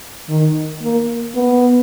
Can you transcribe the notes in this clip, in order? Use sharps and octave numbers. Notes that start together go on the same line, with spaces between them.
D#3
A#3
B3